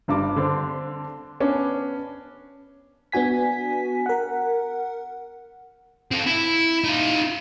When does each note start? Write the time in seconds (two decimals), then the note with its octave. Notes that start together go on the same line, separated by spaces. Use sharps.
0.08 G1 G2 D6
0.36 D3 C4 D4
1.40 B3 C#4 D4
3.12 B3 D4 F#4 G#5 B6
4.06 A#4 F#5
6.11 C4 A4
6.27 E4
6.84 D#4 F4